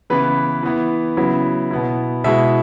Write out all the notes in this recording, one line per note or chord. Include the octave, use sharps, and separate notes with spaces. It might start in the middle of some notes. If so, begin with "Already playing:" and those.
C#3 E3 B3 E4 B4
E3 B3 E4
C#3 F#3 B3 E4
B2 B3 E4
B2 G#3 E4 E5